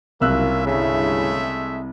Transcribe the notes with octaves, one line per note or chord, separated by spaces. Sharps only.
F#1 C2 A#3 C#4 F4 E5 E6 F#6
D2 G2 C#3 G#3 A3 E4 E5